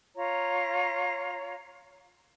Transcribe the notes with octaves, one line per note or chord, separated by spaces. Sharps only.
F4 C#5 A#5